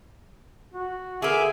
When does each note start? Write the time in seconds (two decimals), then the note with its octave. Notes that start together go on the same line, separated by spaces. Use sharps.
0.74 F#4
1.22 D3 A#3 G#4 E5 G#5 D6